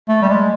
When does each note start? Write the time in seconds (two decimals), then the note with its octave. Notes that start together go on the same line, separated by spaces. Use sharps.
0.09 A3
0.22 G3
0.29 G#3